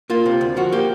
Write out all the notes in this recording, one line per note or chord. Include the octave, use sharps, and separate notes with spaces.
A#3 F4
C3
D2
F3 F#4
A#3 G4